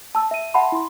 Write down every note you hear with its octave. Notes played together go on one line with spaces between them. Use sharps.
A5 E6
E5 D#7
E5 F#5 A5 B5 C6
E4 C6